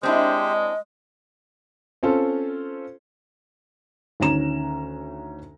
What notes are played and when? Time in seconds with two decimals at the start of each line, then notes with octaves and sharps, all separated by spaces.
0.03 G#3 C4 D4 E4 G4 C5 D#5
2.03 C4 C#4 F4 A4 C5
4.20 D2 D#3 C#4 A#5 E7